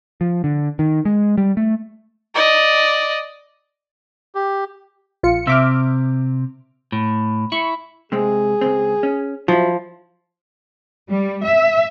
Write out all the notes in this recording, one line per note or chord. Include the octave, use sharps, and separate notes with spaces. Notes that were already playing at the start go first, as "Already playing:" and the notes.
F3
D3
D#3
G#3
G3
A3
D5 D#5
G4
A#1 F4 C#7
C3 E5 D6 F6
A2
E4 C#6
C3 G#3 C4 G#4
C#2 F#2 C4
C#4
F3 F#3 E4
G3
E5